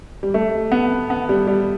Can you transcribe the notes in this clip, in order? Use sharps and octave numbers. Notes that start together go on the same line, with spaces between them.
G3
A3
B3
B3
G3
G3